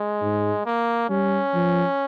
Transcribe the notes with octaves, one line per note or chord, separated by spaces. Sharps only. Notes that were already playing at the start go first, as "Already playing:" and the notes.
Already playing: G#3
G#2
A#3
G3 C#4
F3